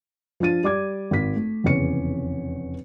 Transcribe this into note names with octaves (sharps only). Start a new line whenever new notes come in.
F3 D4 F4 A6 D#7
G3 D5 D6 G#6
G#1 B6
A3
F1 E2 C#3 C#4 C#5 C#7